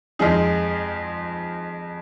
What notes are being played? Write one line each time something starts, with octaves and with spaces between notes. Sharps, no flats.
F2 F3 G#3 D#4 G#4